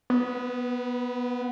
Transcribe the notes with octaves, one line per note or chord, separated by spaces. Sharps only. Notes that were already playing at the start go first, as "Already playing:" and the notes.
B3